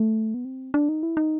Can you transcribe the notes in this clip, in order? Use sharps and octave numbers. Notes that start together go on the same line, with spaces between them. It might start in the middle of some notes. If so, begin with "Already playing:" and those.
Already playing: A3
B3
C4
D4
D#4
E4
D#4